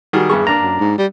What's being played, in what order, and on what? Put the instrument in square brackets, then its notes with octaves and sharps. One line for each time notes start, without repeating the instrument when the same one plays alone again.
[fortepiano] D#3 G3 G#4 [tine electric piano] F#4
[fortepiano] E2 G2 C#6 [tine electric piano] G#4
[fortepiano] A#3 D4 [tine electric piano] A#5
[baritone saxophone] F#2
G#2
G3